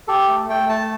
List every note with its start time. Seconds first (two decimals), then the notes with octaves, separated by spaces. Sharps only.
0.08 G4 A4
0.28 A3
0.49 A3 G5
0.69 A3 A5